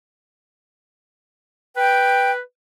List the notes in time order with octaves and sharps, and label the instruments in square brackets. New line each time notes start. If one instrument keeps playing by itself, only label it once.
[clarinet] B4 [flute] G5